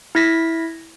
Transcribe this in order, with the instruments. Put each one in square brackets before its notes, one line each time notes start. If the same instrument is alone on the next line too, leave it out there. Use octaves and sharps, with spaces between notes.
[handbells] E4 G#6 A#6 B6